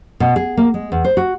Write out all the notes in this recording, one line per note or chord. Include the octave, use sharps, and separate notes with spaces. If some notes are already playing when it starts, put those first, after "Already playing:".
B2
G#4
A#3
G#3
E2
C5
F#4